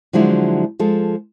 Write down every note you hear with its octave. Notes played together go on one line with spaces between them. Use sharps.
D3 F3 F#3 G#3 E4
F3 G#3 A4